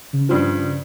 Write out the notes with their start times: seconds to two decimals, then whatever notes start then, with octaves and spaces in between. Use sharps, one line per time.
0.13 C#3
0.29 G2 F3